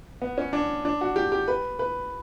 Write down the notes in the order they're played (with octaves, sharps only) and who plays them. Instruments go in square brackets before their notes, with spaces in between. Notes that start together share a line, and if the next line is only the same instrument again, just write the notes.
[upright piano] B3
C#4
D4
D4
F#4
G4
G4
B4
B4